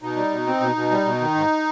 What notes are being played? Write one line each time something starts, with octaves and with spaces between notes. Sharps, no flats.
B2 D#4
G3
B2
C4
B2
B2
G3
B2
D#3
G#2